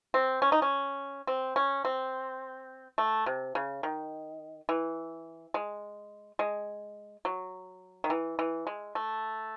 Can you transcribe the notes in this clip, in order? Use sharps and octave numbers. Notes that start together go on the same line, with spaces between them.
C4
C#4
D#4
C#4
C4
C#4
C4
A3
C3
C#3
D#3
E3
G#3
G#3
F#3
D#3
E3
E3
G#3
A3